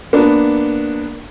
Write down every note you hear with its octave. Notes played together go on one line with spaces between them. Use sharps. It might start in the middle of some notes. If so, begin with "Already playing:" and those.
A#3 B3 D4